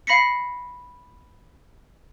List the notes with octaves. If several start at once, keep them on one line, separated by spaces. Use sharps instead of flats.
F5 B5 A#6 B6 C#7